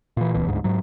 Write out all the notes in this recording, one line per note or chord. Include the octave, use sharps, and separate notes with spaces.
A#2 E3
D1 C#2 B2 E3
G1 D2 G#2
G#2 F#3